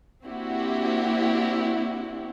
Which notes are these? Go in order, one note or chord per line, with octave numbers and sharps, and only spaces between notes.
A#3 C4 D4 E4 F#4 G4